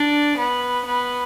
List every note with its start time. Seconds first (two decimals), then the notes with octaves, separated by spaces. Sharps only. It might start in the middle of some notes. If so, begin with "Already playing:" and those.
Already playing: D4 D5
0.37 B3 B4
0.86 B3 B4